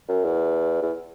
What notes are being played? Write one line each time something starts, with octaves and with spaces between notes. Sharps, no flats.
F#2
E2
E2